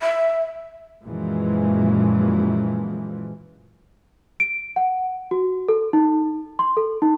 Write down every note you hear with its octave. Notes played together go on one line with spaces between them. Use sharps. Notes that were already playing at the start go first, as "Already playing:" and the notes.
E5
F#2 A#2 E3 F3 G#3
D7
F#5
F#4
A4
D#4
C6
A4
D#4